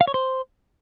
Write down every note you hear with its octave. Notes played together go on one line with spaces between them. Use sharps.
F5
C#5
C5